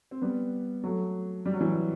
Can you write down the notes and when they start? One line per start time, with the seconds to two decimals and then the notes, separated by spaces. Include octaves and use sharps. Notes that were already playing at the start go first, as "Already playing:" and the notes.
0.11 C4
0.22 G3 B3
0.84 F#3 A3
1.46 G3
1.53 F#3
1.61 E3 G3